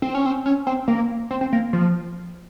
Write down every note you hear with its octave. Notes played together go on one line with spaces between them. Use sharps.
C4
C#4
C4
C#4
C4
A#3
C4
C4
A#3
F3